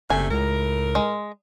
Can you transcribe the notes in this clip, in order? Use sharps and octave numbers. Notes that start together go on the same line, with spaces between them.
F#1 C3 G3 A3 G#5
C#2 A2 A#4
G#3